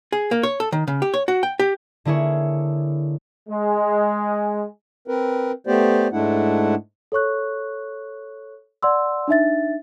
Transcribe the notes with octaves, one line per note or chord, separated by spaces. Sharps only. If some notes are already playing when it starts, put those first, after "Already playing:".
G#4
A#3
C#5
A4
D#3
C#3
G4
C#5
F#4
G5
G4
D3 A#3 E4 G#4 C#5
G#3
C4 A#4 B4
A3 B3 G4 C5 D5
G#2 G#3 A3 D4 E4 F#5
A4 C#5 C#6 F#6
D5 F#5 C6 E6
D4 D#4 E5 A6